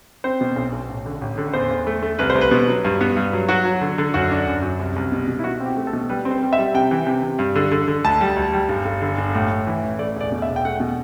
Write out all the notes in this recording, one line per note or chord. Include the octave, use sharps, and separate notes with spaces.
C4 C5
B2
B1
B1
A1
D3
A1
D3
E2 C5
E2
A3
A3
C2 B4
C5
C2
B4
B2
F#3
G2
B3
G2
F#3
F#3 F#4
F#3
D3
D3
F#2 F#4
D4
F#2
F#2
C2
C2
B2
B2
E4
B2 F#4
C4 G4
A3
A4
B2
G3 B4
C4
C5
G3
E5
G3
C3 G5
E3
C3
C3
G2
D3
D3
D3
D2 A5
G3
D2
G3
G1
G1
D3
G1
A2
A2
E3
A1
A3 D5
E1
D5
B2
E5
E1
G5
A3 F#5
B2